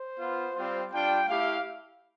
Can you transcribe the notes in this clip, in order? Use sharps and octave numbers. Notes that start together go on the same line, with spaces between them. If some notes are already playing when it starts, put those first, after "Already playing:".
Already playing: C5
B3 F4
G3 C4 F4
G3 D4 F4 G5
A3 E4 G4 F5